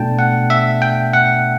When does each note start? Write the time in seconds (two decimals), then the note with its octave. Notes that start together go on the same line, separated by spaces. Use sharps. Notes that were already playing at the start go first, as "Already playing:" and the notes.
Already playing: B2 A3 D4 G5 A5
0.19 F#5
0.50 E5
0.82 G5
1.14 F#5